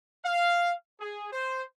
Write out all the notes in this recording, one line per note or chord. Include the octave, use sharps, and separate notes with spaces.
F5
G#4
C5